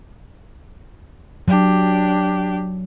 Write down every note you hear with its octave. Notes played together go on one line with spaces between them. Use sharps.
F#3 D4 G4